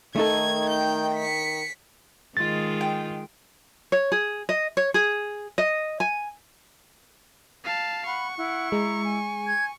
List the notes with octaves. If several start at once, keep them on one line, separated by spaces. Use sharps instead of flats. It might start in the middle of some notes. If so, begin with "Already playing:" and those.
D#3 A3 D#4 A4 G#6
G5 G6
B6 C#7
D#3 G#3 F4 A6
G5
C#5
G#4
D#5
C#5
G#4
D#5
G#5
F5 A5
F#5 B5 C#6
E4 F#5
G#3 A#5
G#5
G#6